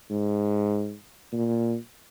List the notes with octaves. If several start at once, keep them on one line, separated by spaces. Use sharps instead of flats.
G#2
A#2